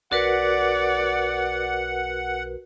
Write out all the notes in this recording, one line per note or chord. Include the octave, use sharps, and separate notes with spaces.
B1 F#4 A#4 B4 D5 F#5